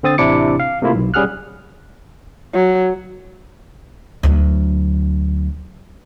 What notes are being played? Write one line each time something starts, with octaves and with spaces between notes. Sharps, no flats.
D3 C4 D#6 A6
A1 C3 D4 E4 D6 C#7
F5
C3 A3 A#3 E4 F4
B1
G3 C#4 G#4 F#5 F6 F#6
F#3
D2 F#3